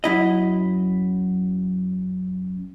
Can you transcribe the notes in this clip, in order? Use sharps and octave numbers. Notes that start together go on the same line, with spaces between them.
F#2 E4 D#5